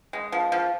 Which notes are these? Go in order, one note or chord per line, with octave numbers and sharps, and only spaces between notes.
G#3
F3
F3